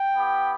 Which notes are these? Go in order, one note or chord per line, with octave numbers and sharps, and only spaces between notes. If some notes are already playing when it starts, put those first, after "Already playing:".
Already playing: G5
B3 E4 G4